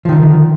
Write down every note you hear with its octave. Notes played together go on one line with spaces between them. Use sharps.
D3 D#3 F3